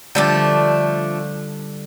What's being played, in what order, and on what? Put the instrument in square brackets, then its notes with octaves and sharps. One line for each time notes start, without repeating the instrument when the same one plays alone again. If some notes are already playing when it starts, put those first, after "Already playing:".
[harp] D3 G3 E5 [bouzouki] F3 A3 D4